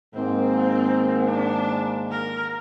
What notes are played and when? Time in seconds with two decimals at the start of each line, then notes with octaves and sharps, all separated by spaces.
0.14 G#2 D#3 A#3 C4
1.27 D4
2.11 A#4